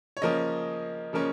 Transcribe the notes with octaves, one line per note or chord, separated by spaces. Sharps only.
C#5
C#3 F3 A#3 C#4 D#5
C#3 F3 A#3 C#4